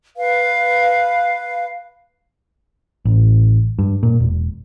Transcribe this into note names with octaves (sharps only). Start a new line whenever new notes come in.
B4 F5
A1
G2
A#2
E1